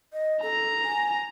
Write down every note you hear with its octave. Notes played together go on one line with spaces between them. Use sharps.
D#5
A4 A#5
G#5